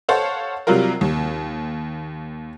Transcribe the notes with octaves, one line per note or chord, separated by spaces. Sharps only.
A4 C5 C#5 F5 F#5 A5
C3 F#3 G3 F4 A#4
D#2